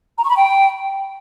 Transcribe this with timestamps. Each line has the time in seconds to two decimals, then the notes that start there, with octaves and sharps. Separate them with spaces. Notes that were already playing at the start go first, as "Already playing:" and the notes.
0.17 A#5
0.23 C#6
0.30 B5
0.36 G5